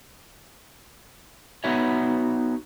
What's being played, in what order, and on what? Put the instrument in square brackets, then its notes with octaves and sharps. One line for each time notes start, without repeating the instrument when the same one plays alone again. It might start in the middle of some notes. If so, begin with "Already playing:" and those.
[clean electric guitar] B3 D#4 F#4 B4 C#5 E5